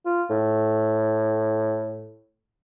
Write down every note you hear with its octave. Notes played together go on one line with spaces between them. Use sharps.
F4
A2